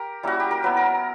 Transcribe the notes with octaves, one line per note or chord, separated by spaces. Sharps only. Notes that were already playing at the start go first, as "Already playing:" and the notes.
Already playing: G4 A#4
G3 A#3 C#4 E4 F#4
G4
A#4
F#3 B3 E4 B4
A#4